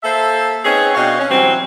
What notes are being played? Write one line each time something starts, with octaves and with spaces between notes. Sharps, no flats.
A#3 A4 C5 E5
C4 C#4 D#4 G#4 B4 C#5
B2 C4 D4 C#5 D#5 F5
C#4
E3 F#3 G3 C4